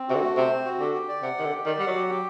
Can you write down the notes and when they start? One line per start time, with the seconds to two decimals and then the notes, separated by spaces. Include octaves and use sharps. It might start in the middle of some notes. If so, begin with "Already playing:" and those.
Already playing: C4
0.08 C3 F#4
0.15 D3
0.22 A3
0.37 C3 C5
0.50 C4
0.65 F#4
0.79 D3 G4
0.95 G4
1.09 D5
1.22 C3 F#5
1.37 D#3 G4
1.44 D3
1.51 G4
1.65 D#3 D5
1.79 G3 F#5
1.87 F#3
1.95 G4
2.09 G4